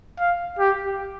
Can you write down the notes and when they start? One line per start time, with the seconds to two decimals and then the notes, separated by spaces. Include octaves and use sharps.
0.19 F5
0.59 G4